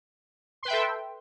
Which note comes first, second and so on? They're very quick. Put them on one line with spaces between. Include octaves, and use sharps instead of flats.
C6 B4 G5 E5 A4